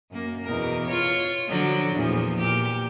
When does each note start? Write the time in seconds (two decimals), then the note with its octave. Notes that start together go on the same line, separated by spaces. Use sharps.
0.11 F#2 A#3
0.45 E2 B2 A#4
0.87 F4 C#5
1.47 D3 F3 F#3
1.93 E2 A#2 F3
2.38 A#2 G4